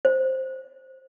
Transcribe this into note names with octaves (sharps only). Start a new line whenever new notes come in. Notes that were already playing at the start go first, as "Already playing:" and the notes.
C5